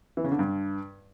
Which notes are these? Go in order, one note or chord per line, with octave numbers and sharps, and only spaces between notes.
E3
C#3
D3
G2